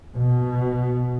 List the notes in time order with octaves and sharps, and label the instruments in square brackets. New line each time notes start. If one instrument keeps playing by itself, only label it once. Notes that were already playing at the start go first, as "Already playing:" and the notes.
[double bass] B2